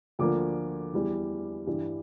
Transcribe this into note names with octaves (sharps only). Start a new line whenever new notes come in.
D2 D3 F3 A#3 D6
E2 E3 G3
G2 E3 G3